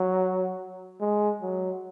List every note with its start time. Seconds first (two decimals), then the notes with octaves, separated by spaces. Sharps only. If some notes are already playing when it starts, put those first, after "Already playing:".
Already playing: F#3
1.00 G#3
1.42 F#3